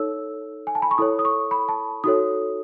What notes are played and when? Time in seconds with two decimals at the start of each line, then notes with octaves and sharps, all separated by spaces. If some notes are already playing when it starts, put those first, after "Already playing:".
Already playing: D#4 A4 C#5 E6
0.67 G#5
0.75 A5
0.82 B5
0.91 C#6
0.98 E4 A4 C#5 D#6
1.19 D#6
1.25 C#6
1.51 B5
1.69 A5
2.04 D#4 F#4 A4 C#5 D#6